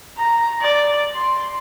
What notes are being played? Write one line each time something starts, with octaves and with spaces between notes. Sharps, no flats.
A#5
D5
C6